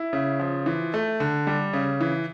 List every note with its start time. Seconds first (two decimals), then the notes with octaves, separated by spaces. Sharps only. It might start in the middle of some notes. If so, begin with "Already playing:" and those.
Already playing: E4
0.13 C#3
0.39 F3
0.66 E3
0.94 A3
1.20 D3
1.47 G3
1.73 C#3
2.01 E3